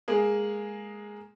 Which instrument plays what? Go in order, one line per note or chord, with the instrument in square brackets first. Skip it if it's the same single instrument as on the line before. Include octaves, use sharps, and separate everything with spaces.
[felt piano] G#3 A#3 G#4